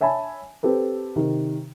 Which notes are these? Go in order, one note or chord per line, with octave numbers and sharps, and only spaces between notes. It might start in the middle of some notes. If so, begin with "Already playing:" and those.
C#5 E5 G#5 A5 B5
C4 G4 A4 B4
C3 D#3